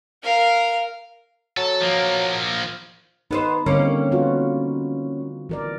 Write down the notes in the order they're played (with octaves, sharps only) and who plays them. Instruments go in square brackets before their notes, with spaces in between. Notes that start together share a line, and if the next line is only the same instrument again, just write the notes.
[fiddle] A#4 F5
[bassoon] F#3 [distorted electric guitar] A4
[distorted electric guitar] F3 A#3
[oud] B3 B4 C5 [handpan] D#4
[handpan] D3 G3 C4 [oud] A#3 C#4
[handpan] B3 F4 F#4
E3 A#4 D5